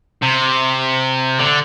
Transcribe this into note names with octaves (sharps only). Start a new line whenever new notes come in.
C3
D3